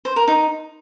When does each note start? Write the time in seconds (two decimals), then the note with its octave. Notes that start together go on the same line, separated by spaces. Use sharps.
0.05 C5
0.16 A#4
0.27 D#4